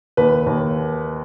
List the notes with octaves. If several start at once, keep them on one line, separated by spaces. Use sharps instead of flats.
D#2 B4
D#2